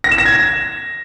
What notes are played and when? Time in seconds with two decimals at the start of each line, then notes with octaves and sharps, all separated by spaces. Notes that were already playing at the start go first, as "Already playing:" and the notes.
0.04 A#6
0.11 E7
0.18 A#6
0.25 G#6
0.32 A#6